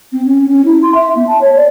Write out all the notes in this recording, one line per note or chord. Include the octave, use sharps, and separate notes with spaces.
C4
C#4
C#4
E4
C6
E5
B3
A5
C#5
D5